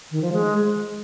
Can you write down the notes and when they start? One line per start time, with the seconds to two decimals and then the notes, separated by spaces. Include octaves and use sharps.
0.11 D#3
0.22 F3
0.33 G#3